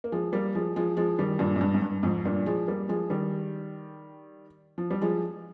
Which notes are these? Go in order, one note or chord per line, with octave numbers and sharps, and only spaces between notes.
A#3
F3 G#3
G3 A#3
F3 G#3
F3 G#3
F3 G#3
D#3 G3
G2 A#2
G#2
G2
G#2
G2
F2 G#2
G2 A#2
F3 G#3
G3 A#3
F3 G#3
D#3 G3
F3
G3
F3 G#3